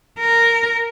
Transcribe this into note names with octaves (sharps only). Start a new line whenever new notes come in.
A#4